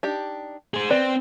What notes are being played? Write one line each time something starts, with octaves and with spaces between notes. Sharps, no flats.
D4 D#4 G4
G#4 C5
C4 B4 D5